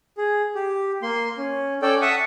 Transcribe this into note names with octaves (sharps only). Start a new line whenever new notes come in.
G#4
G4
A#3 C6
C#4
C#4 A4 D5 G5
E5 F#5 A5 C#6 D#6